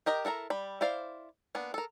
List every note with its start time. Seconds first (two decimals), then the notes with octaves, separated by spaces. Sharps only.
0.06 G4 A#4 D#5 G5
0.25 E4 A4 A#4 A#5
0.50 G3 B5
0.81 E4 C5 D5 F5
1.55 A#3 B3 D4
1.74 A4 A#4